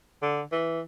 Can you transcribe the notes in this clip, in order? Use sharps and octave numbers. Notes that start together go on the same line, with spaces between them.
D3
E3